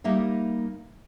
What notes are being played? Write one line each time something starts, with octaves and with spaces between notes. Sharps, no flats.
G3 A#3 D#4 E5